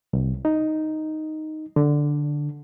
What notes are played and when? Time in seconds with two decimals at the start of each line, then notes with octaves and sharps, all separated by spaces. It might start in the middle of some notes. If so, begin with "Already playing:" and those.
0.13 C2
0.45 D#4
1.76 D3